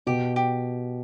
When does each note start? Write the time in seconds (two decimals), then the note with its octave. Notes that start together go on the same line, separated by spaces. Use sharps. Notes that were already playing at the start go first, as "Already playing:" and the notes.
0.07 B2 G4
0.36 G4